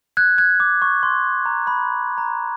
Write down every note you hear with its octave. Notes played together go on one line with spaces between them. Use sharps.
F#6 G#6
F#6 G#6
D6
C#6
C6
A#5
B5
A#5